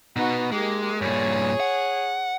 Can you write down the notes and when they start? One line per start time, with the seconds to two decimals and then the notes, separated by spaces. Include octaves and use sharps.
0.16 B2 B3 D#4 F#4
0.52 G#3 A#3 G4
1.01 G2 A#2 G#4 C#5
1.60 F#5